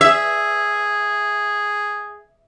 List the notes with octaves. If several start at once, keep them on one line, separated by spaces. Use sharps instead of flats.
G#4 E5